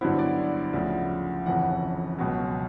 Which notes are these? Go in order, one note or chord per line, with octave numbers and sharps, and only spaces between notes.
G2 D3 F#3 B3 E4 C5
D5
D2 C#3 F3
G1 F2 C#3 E3 F#5
C#2 B2 F#3